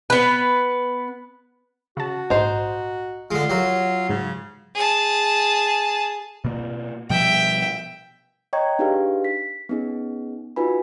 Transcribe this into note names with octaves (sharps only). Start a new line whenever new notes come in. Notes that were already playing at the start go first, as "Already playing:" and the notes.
B3 B4
C#3 F#4 A5
A#1 G#2 D#4 C5
D3 G#3 F4
F#3 G4 A#4 F5
G#2 C#3
G#4 A5
B2 A#3
B2 F3 G3 E5 G5
C#5 D#5 G5 A#5 C#6 G#6
D4 D#4 G4 G#4 B4 F5
B6
B3 C#4 D#4 G#4
D#4 F4 F#4 B4 G#5 B5